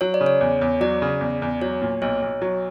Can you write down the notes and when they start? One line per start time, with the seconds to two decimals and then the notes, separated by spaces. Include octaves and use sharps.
0.01 F#3 C#5
0.14 D5
0.21 C#3
0.26 C#5
0.41 E2
0.61 E2
0.81 F#3 D5
1.02 C#3
1.21 E2
1.42 E2
1.62 F#3 C#5
1.82 A#2
2.02 B1 C#5
2.22 B1
2.42 F#3